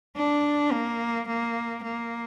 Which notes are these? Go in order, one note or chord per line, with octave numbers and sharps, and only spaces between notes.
D4
A#3
A#3
A#3